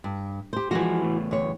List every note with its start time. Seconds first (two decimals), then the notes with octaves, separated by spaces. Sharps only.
0.04 G2
0.53 G4 C5
0.71 E3 F3 G#3 F#4
1.01 E2 A2
1.31 D2 C#5